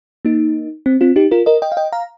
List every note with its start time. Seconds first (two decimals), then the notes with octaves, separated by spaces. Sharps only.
0.25 A#3 D#4
0.86 C4
1.01 C4 F4
1.16 D#4 G4
1.31 F4 A#4
1.46 A#4 D#5
1.62 D#5 G5
1.72 F5
1.77 D#5 G5
1.92 F5 A#5